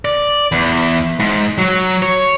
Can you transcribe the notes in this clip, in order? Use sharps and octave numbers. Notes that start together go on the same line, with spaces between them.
D5
E2
G#2
F#3
C#5